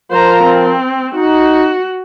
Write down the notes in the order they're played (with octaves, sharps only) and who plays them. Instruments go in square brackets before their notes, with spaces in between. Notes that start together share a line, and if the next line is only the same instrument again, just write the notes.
[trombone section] F3 F4 A#4 [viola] C5 A#5
[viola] C4
[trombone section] D#4 [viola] F#4